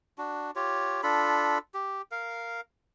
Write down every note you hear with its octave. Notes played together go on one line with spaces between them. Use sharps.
D4 F#4
F4 G4 C#5
D4 F4 A4 B5
G4
A#4 F5